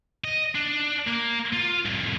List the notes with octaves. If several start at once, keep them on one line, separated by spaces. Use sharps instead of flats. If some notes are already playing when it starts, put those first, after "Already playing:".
D#5
D4
A#3
F4
C2 F2